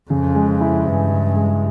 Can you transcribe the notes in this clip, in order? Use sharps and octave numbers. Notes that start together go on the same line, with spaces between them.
F2 C#3
G#3
E4
G2 E3
C#3
G#3